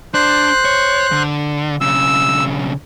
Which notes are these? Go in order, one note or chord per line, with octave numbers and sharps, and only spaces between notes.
D4 C5 F#6
C#5
D3
B1 C#3 E6